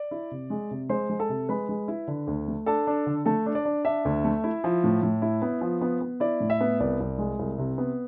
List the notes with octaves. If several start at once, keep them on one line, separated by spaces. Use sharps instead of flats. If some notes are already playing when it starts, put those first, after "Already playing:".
Already playing: D5
E4
C3
G#3
C3
G#3 C5 C6
G#3
A4 A5
C3
G#3 B4 B5
G#3
E4
D3
D2
A3
D4 A4 A5
D4
D3
A3 A4 A5
D4
D5
D4
D4 E5
D2
A3
E4
F3
A2
A2
E4
B3
F3
B3
B3
E4 D5
A2
E5
B3
C2 D5
C2
G#3
C2
C3
B3